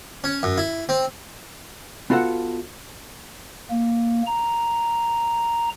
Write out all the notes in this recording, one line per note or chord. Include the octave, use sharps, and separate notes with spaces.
C#4
F#2
E4
C4
B3 F4 F#4 A4 F#5
A#3
A#5